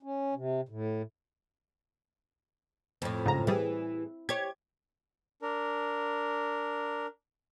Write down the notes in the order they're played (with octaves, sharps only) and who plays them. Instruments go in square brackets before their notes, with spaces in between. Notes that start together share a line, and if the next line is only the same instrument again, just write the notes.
[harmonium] C#4
C3
A2
[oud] F2 A2
[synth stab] G#2 C#3 A#5
[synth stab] A2 G3 G#4 [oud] E3
[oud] G4 C#5 [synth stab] G#6
[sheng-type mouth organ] D4 A#4